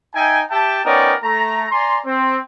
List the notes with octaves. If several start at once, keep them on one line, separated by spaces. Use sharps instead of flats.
D#4 E5 G5 G#5
G4 E5 G5 A5
B3 C#4 D#4 A#4 D5 G5
A3 A#5
D5 G#5 A#5 C6
C4